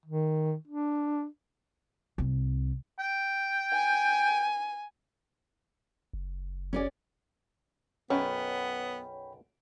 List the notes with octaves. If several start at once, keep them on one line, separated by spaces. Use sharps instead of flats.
D#3
D4
C2 C4
G5
G#5
F#1
C#4 G#4 D5
B1 F#2 B3 C#4 C#5 G5 B5